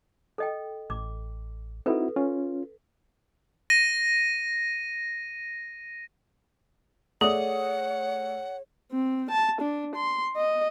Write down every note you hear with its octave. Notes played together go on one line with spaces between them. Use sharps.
A4 D#5 G5
A1 D6
C4 D#4 E4 F#4 A4 B4
C#4 F4
A#6 D#7
A3 G#4 C#5 D5 F#5 D#6
C4
A5
D4
C6
D#5